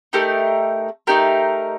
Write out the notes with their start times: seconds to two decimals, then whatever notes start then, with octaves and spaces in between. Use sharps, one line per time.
0.13 A3 D#4 G4 A#4
1.07 A3 D#4 G4 A#4